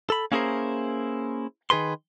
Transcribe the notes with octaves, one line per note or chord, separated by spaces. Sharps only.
A4 B5
A#3 C#4 E4 G#4 A#4 C5
D#3 G#4 B4 C6